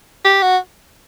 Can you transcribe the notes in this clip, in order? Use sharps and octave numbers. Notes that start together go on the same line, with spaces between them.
G4
F#4